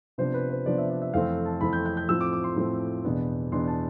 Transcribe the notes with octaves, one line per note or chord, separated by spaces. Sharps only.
C3 F3 B3 D4 C5
B4
C5
C3 F3 B3 D4 D5
E5
D5
E5
F2 E3 A3 C4 F5
A5
F2 E3 A3 C4 B5
G6
G6
G6
A2 F3 C4 E6
D6
D6
C6
A2 F3 C4
E2 B2 B3 D4
E2 B2 B3 D4 C6
A5